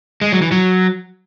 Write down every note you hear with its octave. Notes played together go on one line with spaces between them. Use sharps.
G#3
F#3
E3
F#3